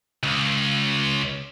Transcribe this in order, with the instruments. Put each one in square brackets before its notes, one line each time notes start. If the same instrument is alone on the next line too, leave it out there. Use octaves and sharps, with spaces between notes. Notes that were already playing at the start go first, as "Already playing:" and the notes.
[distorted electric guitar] C#2